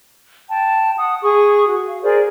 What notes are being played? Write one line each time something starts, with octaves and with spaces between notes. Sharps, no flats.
G5 A5
F#5 D#6
G#4 C#6 D#6
F#4
F5
G#4 A#4 C5 D5